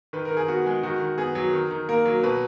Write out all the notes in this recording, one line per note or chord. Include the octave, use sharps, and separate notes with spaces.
D#3 B4
A#4
D#3
G#4
B3 F#4
G#3
D#3 F#4
D#3
B3 G#4
F#3
D#3
D#3
A#3 A#4
F#3
B2 B4